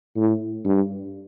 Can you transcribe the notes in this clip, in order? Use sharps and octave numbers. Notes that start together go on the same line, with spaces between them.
A2
G2